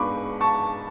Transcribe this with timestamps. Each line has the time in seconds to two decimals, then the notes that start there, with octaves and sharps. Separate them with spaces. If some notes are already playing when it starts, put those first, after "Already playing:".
Already playing: G#2 G#3 B3 D4 B5 C#6 D6
0.41 A5 C#6